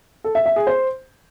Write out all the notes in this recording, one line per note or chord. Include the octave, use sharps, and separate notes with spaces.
A4
E5
E5
G#4
C5